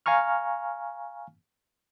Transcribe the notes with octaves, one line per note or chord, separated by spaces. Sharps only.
F5 G#5 A#5 C#6 F6